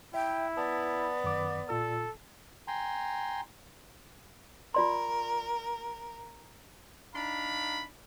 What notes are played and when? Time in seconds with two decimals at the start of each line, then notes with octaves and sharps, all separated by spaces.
0.14 E4 E5 G5
0.57 B3 D5 A5 B5
1.24 F#2 D#3 D6
1.69 A#2 F4 A4 E6
2.68 G5 G#5 A#5 C6
4.74 F4 A#4 D5 C6
7.14 D4 D#4 F5 A#5 B5